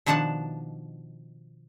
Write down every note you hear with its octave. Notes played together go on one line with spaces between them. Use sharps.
B2 D#3 F3 D4 F#5 A5